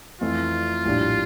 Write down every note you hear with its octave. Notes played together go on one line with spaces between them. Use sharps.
F2 E3 A3 F4
A#1 A2 G3 D4